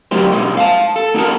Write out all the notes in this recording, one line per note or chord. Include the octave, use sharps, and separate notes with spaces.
D2 F#3 A#3 D#4 G4 C5
B2 G#3 A#3 D#4
F5 G5 A5
A4
A#3 D#4 F#4 G4 A4 A#4